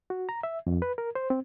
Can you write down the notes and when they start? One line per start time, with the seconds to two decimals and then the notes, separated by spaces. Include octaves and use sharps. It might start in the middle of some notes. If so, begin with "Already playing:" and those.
0.10 F#4
0.29 A#5
0.43 E5
0.67 F2
0.82 B4
0.98 A#4
1.15 C5
1.30 C4